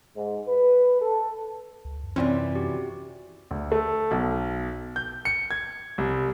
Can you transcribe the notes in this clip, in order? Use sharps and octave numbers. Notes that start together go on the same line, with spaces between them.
G#2
B4
A4
C#2
F#2
C3 E3 C4 C#4 F4 D5
F#4 G4
D2
A3
B1
G6
C#7
G#6
C2